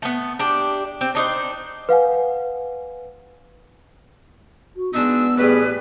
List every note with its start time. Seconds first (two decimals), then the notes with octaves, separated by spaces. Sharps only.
0.02 A3 B3
0.39 D4 G4
1.01 C4
1.15 D4 D#4 C5
1.89 B4 F5 F#5 G#5
4.76 F#4
4.94 G#3 B3 D4 D#4 E6
5.38 A1 G3 G#4 B4